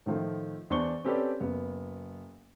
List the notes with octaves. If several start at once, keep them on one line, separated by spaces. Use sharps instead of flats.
A2 D#3 F3 A3
E2 D4 C5 C#6 G7
C4 C#4 G4 A4 B4 D5
F#1 B3